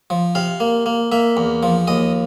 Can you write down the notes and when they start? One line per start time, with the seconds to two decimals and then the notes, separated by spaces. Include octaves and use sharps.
0.10 F3
0.35 C3 F5
0.60 A#3
0.86 A#3
1.12 A#3 E5
1.37 E2
1.63 F3
1.88 D#2 D#5